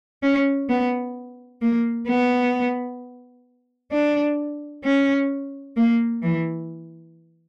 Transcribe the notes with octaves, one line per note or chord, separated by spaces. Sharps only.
C#4
B3
A#3
B3
D4
C#4
A#3
E3